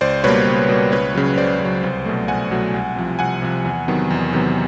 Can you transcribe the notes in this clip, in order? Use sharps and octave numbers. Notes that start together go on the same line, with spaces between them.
C#2 C5 D5
B2 G3 A#3 B4 C#5
C#2
B2 G3 A#3
C#2 B4 C#5
C#3 F#3
C#2 C5 D5
C#3 F#3
C2
B2 F#3 A3
C2 F#5 G#5
B2 F#3 A3
C2
C3 F3
C2 F#5 G#5
C3 F3
E2
C3 D#3 F#3 B3
E2
C3 D#3 F#3 B3